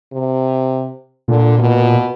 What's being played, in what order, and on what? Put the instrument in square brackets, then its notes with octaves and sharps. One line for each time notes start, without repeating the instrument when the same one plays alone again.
[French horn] C3
[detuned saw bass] A#2 [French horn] D3
[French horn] B2